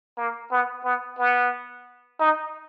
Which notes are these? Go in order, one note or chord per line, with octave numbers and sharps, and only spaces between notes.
A#3
B3
B3
B3
D#4